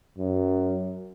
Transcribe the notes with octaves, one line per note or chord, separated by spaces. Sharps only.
F#2